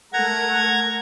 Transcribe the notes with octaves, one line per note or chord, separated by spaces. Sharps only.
A3 A#4 F#5 A#5 G#6